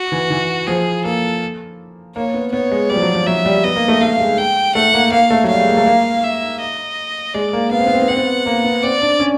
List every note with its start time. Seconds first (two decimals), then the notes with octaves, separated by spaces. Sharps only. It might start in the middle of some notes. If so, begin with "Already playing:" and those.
Already playing: F#4
0.12 E3
0.30 E3
0.67 F3 G#4
1.04 A#3 A4
2.16 A#3 C#5
2.34 B3
2.52 B3 C#5
2.71 G#3
2.90 G3 D5
2.96 F3
3.02 F#3
3.14 F3
3.27 F#3 E5
3.45 G3
3.64 B3 D#5
3.76 A#3
3.88 A3
4.01 A3 F5
4.20 G#3
4.38 G5
4.75 A3 F#5
4.94 A#3
5.12 A#3 F5
5.30 A3
5.44 F#3
5.49 G3 F5
5.58 G#3
5.68 A#3
5.77 A3
5.86 A#3
6.24 E5
6.60 D#5
7.34 G#3 D5
7.53 A#3
7.71 B3 F5
7.79 C4
7.87 B3
7.94 C4
8.02 B3
8.08 C4 F#5
8.17 B3
8.46 A#3
8.64 B3
8.83 C4 D5
9.02 D4
9.20 C#4